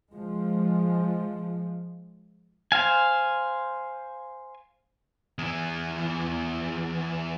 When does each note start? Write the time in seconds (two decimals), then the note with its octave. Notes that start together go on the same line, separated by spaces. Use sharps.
0.13 F3 G#3
2.72 C5 F5 G#5
5.39 E2 E3